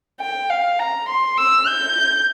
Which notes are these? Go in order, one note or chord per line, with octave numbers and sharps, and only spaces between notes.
G5
F5
A#5
C6
E6
G6